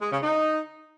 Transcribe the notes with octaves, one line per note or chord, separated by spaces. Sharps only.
G#3
C#3
D#4